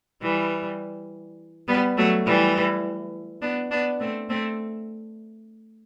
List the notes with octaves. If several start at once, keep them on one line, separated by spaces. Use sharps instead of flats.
E3 G3
G3 B3
F#3 A3
E3 G3
B3 D4
B3 D4
A3 C4
A3 C4